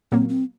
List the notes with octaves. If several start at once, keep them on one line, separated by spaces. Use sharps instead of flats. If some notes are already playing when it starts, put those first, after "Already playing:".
A#2 F#3 A#3 C4
C4